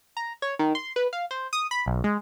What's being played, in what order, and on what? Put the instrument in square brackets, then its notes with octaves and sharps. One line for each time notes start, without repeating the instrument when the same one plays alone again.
[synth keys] A#5
C#5
D#3
C6
B4
F5
C5
D#6
B5
B1
G#3